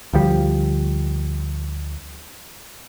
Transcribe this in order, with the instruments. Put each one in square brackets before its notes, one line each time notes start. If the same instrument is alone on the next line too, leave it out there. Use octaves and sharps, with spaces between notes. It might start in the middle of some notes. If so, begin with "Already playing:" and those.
[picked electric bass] D2 F3 G3